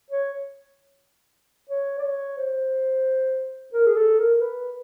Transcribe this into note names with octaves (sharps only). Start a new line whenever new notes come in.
C#5
C#5
D5
C#5
C5
A#4
G#4
A4
A#4
B4